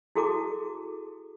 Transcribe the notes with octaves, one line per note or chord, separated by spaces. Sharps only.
E4 F#4 G#4 A4 A5 D6